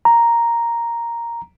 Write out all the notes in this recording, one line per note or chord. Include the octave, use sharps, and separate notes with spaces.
A#5